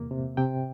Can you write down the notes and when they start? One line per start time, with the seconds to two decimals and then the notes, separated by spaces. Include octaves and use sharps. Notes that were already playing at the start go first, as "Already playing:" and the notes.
Already playing: E2 C3 A#3
0.11 C3
0.37 C3 G5